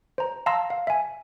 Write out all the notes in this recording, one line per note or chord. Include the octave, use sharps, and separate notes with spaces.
C5 A#5
F5 A5 A#5 C6 E6 A#6
F5
E5 G#5